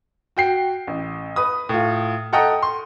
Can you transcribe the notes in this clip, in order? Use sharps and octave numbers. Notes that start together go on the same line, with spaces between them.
F#4 G5 C7
A1
B4 D#6
A2 F4
A4 D#5 F#5 G5 A#5 D#6
C6